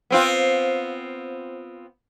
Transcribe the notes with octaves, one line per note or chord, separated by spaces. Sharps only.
B3 C4 F4